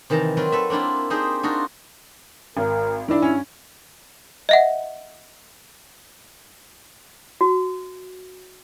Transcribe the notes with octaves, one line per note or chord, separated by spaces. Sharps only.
C3 D#3 E3 A5 A#5
F#3 C4 F4 B4
A4 B4 E5
A#3 C4 D4 E4 F4
D4 D#4 G4 G#4 C5
D4 D#4 F4 F#4
G#1 A#4
D#3 D4 E4
G2 C#4
D#5 E5 F#5
F#4